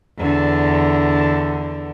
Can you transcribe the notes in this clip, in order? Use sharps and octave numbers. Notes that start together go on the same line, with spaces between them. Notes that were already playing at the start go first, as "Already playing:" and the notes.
E2 D3